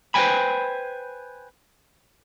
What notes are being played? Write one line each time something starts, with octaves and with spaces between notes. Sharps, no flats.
B4 C5 D#5 G5 G#5 B5